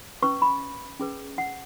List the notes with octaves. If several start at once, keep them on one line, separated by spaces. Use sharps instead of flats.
C#4 B4 C#6
B5
C#4 G#4 B4
F#5